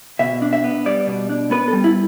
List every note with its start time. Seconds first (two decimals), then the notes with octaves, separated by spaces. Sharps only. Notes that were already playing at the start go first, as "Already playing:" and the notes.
0.19 B2 E5
0.42 D4
0.53 E5
0.64 B3
0.86 G3 D5
1.07 B2
1.29 D4
1.51 B3 B4
1.68 A4
1.73 G3
1.84 E4